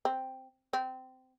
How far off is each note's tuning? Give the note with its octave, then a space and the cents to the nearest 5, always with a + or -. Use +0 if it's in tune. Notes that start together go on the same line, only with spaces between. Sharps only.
C4 +0
C4 -20